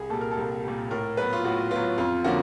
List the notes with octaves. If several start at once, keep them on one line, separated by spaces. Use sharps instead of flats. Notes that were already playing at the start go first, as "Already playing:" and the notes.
Already playing: C2 G#4
A#2 G3 A4
A#4
A4
C2
A#2 G3
A2 A#4
F#3 B3 B4
F4
A2 F#4
F#3 B3 F4
F2 F4
D3 F3 A#3 C#4 F#4